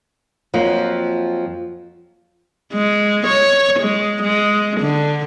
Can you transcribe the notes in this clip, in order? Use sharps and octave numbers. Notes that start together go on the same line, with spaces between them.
F2 F3 F#3 A#3
G#3
C#5
G#3
G#3
D3